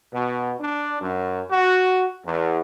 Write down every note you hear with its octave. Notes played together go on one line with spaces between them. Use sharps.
B2
D4
F#2
F#4
E2